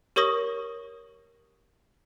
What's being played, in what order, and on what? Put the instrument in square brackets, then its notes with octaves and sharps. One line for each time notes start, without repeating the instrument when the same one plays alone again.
[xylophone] G4 A#4 C#5 C#6 D#6 A#6